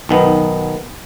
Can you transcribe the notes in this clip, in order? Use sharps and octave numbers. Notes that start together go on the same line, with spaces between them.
B1 D#3 B3